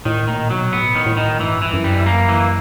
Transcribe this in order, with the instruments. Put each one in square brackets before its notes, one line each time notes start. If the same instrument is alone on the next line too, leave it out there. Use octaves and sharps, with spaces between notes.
[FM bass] A2 [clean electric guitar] D#3
[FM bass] A#2 [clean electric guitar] D#3
[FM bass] B2 [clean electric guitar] F#3
[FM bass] A2 [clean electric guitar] B3
[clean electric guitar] D#3
[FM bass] A2
[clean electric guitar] D#3
[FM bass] G2 [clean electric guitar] E3
[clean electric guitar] E3
[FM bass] F#2
[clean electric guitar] G3
A#3
E3